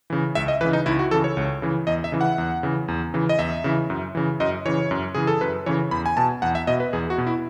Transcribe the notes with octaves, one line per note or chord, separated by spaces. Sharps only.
C#3 E3
C#2 E5
D#5
C#3 E3 B4
D#4
C#2 E4
F#4
C#3 E3 A4
C#5
C#2
C#3 E3
E2 D#5
E5
C#3 E3
F#5
E2
C#3 E3
E2
C#3 E3
D#5
E2 E5
C#3 E3
F#2
C#3 E3
F#2 D#5
C#3 E3 C#5
F#2
C#3 E3 G#4
A4
F#2 B4
C#3 E3 C#5
E2 B5
G#5
B2 A5
E2 F#5
E5
B2 D#5
B4
E2 G#4
F#4
B2
E4